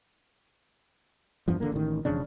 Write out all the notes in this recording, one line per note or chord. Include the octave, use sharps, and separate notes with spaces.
E2 G2 F3
D3 A#3
A1 D#3
E1 F2 C#3 D4